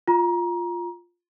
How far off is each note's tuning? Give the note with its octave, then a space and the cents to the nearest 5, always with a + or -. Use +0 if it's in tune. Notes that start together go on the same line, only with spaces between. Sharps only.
F4 +0 A#5 +25